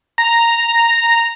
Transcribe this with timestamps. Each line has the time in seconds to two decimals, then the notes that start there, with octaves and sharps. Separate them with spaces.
0.18 A#5